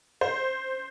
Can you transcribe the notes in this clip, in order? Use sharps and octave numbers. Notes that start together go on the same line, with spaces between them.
C5